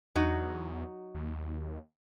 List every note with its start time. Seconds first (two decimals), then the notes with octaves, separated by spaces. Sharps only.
0.15 E2 F#3 D#4 F#4
1.15 D#2